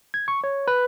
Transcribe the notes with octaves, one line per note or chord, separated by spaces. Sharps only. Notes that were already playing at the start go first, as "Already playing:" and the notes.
G#6
C#6
C#5
B4